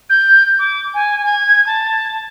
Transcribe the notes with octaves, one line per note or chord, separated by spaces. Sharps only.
G6
D6
G#5
G#6
A5